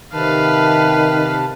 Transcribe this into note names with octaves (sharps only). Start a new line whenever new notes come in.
C3 D#3 B4 F5 A5